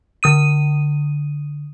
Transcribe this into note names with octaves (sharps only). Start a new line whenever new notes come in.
D3 D#6 D#7